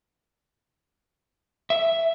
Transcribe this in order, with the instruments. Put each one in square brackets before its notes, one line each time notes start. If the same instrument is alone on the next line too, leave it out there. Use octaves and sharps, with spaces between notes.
[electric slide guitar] E5